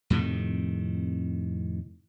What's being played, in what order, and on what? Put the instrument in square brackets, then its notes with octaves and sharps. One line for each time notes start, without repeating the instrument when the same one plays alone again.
[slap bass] F2 A2 C3 D#3